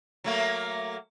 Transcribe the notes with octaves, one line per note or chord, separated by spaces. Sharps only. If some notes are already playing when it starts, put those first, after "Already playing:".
F#3 A3 A#3